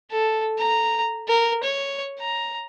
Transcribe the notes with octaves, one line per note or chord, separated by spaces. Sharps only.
A4
A#5
A#4
C#5
A#5